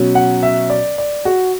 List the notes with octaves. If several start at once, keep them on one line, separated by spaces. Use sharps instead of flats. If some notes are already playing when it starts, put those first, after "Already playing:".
Already playing: B2 F#3 C#4
F#5
E5
D5
D5
F#4